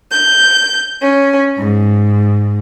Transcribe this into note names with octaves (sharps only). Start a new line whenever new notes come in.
G6
C#4
G#2